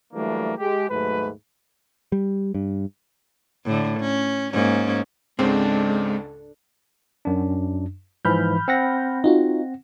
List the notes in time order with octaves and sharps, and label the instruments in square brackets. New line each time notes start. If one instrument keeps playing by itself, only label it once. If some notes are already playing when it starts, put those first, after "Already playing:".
[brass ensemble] E3 F#3 G3 A3 A#3 D4
G#3 G4
D#2 G#2 F#3 A3 B4
[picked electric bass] G3
G2
[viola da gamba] A2 D3
C#4
G#2 A#3 C#4
[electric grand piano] C#2 G#2 C#3 [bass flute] G#3 [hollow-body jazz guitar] C4 [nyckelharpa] D4 A4
[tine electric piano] F#2 D4
[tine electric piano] G#2 E3 F3 [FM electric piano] B5 F6 G6
[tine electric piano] C4 F#5 A#6
[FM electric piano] D#4 F4 F#4